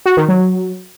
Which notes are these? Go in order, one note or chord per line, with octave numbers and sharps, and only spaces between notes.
F#4
D#3
F#3